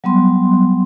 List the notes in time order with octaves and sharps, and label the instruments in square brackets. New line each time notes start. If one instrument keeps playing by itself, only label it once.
[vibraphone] F#3 G3 B3 C6